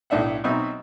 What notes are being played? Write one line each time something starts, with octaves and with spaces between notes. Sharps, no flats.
B1 A2 D4 E5 F#5
B2 F#3 C4 D#4 E5